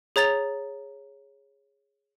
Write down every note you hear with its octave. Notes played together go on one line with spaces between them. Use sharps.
G#4 C#5 A#5 A6 F7